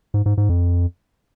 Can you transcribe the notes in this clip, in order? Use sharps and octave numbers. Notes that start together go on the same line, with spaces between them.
G#2
G#2
G#2
F2